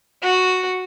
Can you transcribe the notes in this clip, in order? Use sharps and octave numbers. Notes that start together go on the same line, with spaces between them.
F#4